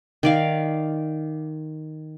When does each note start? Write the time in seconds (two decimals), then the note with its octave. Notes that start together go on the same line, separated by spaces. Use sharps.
0.23 D#3 D5 F5